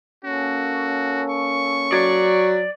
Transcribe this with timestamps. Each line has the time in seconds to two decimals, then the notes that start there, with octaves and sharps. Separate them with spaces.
0.25 A#3 C#4 F#4 A4
1.31 C#6
1.92 F#3 D5